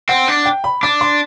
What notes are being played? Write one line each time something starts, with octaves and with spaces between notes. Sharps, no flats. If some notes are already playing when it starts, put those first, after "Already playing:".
C4 F#5
D4
G5
B5
D4 D6
C6